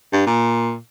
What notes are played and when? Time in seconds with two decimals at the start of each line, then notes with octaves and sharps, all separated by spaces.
0.12 G2
0.27 A#2